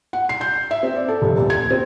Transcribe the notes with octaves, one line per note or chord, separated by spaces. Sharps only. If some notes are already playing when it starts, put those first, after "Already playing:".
F#5
C7
G6
E5
C4
D5
A4
F1
D#1
G#6
C4